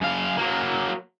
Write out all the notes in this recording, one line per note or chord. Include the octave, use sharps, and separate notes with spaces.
F#2 F5
F#3 A#3